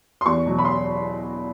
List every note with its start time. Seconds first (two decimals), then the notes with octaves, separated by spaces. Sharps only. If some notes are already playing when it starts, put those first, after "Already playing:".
0.21 C6
0.26 E2 C#6
0.46 B2 F#3
0.59 B5
0.65 C6